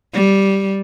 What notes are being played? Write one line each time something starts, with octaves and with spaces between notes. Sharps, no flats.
G3